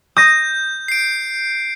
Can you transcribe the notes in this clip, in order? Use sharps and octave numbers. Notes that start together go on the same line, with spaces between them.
D#6 G6 A#6
C7 D7